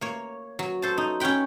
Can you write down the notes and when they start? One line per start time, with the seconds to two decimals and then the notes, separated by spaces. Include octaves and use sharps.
0.01 A#3 C#5
0.59 F#3
0.82 A4 C5 A5
0.98 D#4
1.20 C#4 C#5 F#5 G5 B5